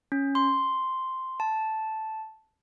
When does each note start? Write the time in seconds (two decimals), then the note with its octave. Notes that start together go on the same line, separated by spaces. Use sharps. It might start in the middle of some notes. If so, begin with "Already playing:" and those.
0.12 C#4
0.35 C6
1.40 A5